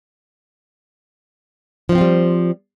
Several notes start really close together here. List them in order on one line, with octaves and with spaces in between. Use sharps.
F3 D#4 C4 F4 G3